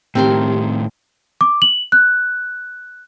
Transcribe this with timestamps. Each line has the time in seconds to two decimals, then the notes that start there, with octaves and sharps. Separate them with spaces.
0.15 A2 D#3 C4 G4 A#4 C6
1.41 D6
1.62 F#7
1.92 F#6